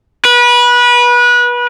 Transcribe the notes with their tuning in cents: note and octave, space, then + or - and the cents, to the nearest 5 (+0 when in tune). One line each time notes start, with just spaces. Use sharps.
B4 -25